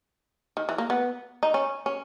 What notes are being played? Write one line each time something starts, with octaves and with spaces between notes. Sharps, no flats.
D#3
E3
A#3
B3
D#4
C#4
C#4